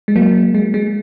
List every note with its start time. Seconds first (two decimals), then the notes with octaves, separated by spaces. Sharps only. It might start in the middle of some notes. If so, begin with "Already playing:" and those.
0.08 G#3
0.16 F#3 A#3
0.55 G#3
0.74 G#3